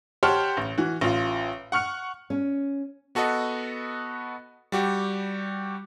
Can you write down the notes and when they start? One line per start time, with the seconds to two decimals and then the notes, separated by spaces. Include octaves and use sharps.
0.23 G4 C5 C#5 F#5 A5 F6
0.57 A1
0.78 E3 F#4
1.01 A1 F4
1.72 F#5 C#6 F6 C#7
2.30 C#4
3.15 B3 F#4 A4 B4 D#5
4.72 G3 F#4 G4